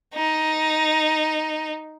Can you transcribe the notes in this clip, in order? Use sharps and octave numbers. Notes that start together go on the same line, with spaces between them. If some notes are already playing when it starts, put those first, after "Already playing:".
D#4